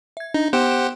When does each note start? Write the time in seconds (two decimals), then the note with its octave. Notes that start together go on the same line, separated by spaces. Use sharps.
0.17 E5 G#6
0.34 D4 D#4
0.53 B3 G4 C5 F#5 D7 E7